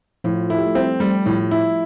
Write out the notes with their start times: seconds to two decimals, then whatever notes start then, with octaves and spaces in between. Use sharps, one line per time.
0.24 A2 F3 F4
0.50 E4 A4
0.58 G4
0.66 A3 A4
0.75 G3 C4 G4
1.00 G3 A3
1.26 A2 F3
1.51 E4